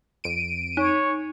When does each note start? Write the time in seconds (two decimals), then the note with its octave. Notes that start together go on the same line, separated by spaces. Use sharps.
0.24 F2 D7 D#7
0.77 D#4 C#5